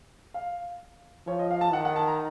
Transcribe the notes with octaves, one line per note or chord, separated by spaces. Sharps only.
F5
F3 C#5
D#5
F5
A5
D#3 F#5
F#5
A5
A#5